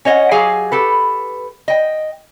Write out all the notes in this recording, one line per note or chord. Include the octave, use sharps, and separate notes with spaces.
C#4 C#5 D#5 F5 F#5
F#3 G4 G#4 F5 G#5
G4 A4 B4
D#5 G5